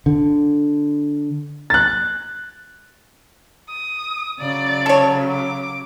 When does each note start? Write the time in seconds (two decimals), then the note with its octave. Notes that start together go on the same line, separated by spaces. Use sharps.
0.06 D3
1.70 F#6 A6
3.69 D#6
4.39 C#3 F#3 D5
4.86 A4 C#5
5.31 D6